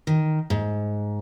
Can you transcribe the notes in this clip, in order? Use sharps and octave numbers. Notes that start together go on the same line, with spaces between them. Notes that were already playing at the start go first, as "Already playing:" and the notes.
D#3
G#2